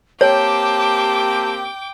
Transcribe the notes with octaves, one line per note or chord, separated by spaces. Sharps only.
A#3 C4 G4 C#5 G5 A5 D6